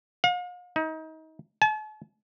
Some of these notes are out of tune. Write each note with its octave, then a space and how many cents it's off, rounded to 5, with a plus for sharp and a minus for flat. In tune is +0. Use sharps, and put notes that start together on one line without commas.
F5 +45
D#4 +30
A5 -45